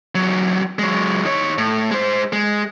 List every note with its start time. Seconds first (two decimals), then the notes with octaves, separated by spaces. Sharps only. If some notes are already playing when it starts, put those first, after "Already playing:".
0.15 E2 F#3
0.79 F#3 G#3
1.25 D#3 C#5
1.58 A2
1.91 G#3 C5
2.33 G#3